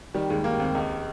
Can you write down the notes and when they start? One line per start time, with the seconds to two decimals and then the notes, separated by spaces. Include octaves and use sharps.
0.14 D#3 G3
0.30 D#2 G#3
0.44 D#3 A#3
0.60 D#2 C4
0.75 C#2